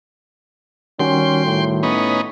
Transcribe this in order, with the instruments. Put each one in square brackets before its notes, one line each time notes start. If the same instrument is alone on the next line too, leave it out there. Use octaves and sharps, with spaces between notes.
[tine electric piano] D#3 G3 F#4 [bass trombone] C#4 [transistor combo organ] G5 C6
[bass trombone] A2
[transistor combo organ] B3 C#4 D#4